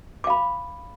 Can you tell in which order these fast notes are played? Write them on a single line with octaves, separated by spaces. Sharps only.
D6 F5 B5